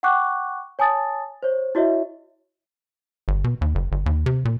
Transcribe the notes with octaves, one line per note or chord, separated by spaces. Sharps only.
F#5 G5 C#6 D6 F#6
C#5 G#5 A5 D#6 A6
C5 C#5
E4 F#4 C#5 D#5 E5
G1
B2
D#2
F#1
G1
D#2
C3
A#2